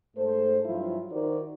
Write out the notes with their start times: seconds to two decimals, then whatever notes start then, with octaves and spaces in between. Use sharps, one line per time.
0.16 G#2 A3 A4 C5
0.65 G2 F3 F#3 E4 F4
1.11 D#3 D#4 F#4 A#4 C5 D5